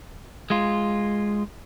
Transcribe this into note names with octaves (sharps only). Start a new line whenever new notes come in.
G#3 F4